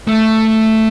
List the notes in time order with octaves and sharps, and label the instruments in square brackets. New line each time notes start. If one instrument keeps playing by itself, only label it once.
[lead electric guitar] A3